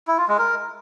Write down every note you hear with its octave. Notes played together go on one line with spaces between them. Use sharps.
E4
F4
G#3
A#4